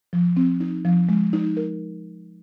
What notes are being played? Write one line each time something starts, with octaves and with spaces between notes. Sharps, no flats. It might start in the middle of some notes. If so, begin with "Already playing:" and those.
F3
C4
D#4
F3
G#3
D#4
A#4